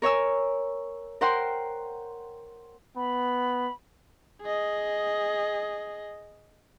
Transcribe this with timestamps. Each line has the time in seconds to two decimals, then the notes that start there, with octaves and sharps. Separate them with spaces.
0.02 A#4 C#5 G#5 E6
1.21 A#4 C5 F#5 G5 C6
2.97 B3 B5
4.42 G#4 D#5